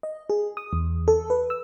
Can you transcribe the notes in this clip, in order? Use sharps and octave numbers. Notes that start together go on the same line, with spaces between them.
D#5
G#4
D#6
E2
A4
B4
E6